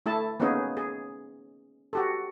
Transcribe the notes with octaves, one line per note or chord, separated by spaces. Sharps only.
A3 E4 A4 A5
A#3 B3 C#4 D#4 G#4
G#4
F#4 G4 A4